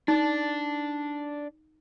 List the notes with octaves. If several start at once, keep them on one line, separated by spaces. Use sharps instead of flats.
D4 D#4